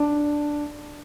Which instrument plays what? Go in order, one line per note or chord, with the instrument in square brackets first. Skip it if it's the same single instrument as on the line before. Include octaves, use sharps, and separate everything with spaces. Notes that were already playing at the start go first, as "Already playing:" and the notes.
Already playing: [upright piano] D4